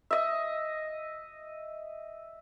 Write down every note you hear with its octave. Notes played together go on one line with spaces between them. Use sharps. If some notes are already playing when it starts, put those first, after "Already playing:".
D#5 E5